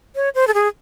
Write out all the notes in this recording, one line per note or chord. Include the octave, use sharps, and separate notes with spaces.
C#5
C5
A4
G#4